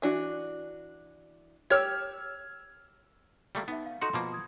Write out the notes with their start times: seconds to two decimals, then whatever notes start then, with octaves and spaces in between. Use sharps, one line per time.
0.02 E3 D4 F#4
1.70 G4 C#5 E6 F6 G#6
3.55 G3 A3 A#3
3.68 B3 D#4 E5
3.86 F5
4.01 D#4 F#4 A4 F#5 C6
4.13 B2 F3 A#3 B5 D6
4.32 D#6 G#6